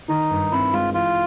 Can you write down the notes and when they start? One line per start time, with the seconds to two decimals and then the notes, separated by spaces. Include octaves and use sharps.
0.08 D#3 D#4
0.30 G2
0.52 C4 E4
0.73 G#3 F4
0.94 E3 F4